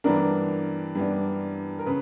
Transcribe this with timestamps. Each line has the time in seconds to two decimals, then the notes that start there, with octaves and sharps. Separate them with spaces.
0.04 G2 E3 B3 D4 A#4
0.95 G2 E3 B3 D4
1.79 A#4
1.86 C#3 B4